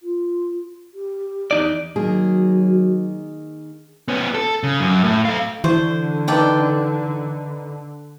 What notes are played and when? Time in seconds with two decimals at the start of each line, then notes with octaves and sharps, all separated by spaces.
0.03 F4
0.94 G4
1.51 E2 D#4 D5
1.96 D#3 F#3 A#3 G#4
4.08 B3 C#4
4.34 A4
4.63 C#3
4.80 F#2
5.04 A2
5.25 A4 F5
5.64 D3 E3 C5 C#6
6.28 D#4 A4 B4 D5 G5